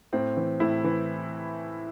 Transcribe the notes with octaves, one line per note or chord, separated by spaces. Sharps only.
A2 C4
E3
A2 E4
E3